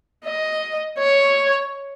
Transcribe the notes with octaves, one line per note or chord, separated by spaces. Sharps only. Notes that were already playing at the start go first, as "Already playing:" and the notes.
D#5
C#5